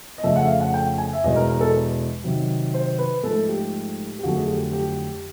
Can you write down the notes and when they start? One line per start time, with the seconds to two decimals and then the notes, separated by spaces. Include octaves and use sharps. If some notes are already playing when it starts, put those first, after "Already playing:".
0.18 D#5
0.23 F2 C#3 F3 A3 E5
0.36 F#5
0.43 E5
0.48 F5
0.61 F#5
0.74 G5
0.98 G#5
1.13 E5
1.24 E2 B2 G#3 D#5
1.36 A#4
1.49 A#4
1.60 A4
2.24 C3 D#3 F#3
2.74 C5
2.98 B4
3.23 G#2 F3 A3 A4
3.49 G4
4.19 G4
4.23 F2 D3 F#3 A3 F#4
4.37 G#4
4.48 G4
4.73 G4